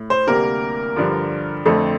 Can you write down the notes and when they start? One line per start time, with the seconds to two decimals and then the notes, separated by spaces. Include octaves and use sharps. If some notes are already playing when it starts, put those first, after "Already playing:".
Already playing: A2
0.10 C5
0.27 D2 C3 G3 A#3 A#4
0.96 G2 D3 F3
1.65 F2 D3 A3 C4 A4